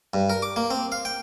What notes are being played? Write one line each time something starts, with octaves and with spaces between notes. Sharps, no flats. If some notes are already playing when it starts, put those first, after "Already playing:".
G2
A#4
D6
A#3
C4
F5
G5